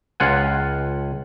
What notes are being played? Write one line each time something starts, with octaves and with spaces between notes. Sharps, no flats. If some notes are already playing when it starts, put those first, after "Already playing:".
C#2 F4 F#5 G#5